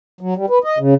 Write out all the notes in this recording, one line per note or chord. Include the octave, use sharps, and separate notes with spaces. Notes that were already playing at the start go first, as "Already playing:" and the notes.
F#3
G3
B4
D#5
C#3